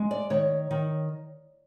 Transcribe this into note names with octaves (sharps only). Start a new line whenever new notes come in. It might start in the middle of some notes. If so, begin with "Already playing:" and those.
Already playing: G#3
D5
D#3 C#5
D#3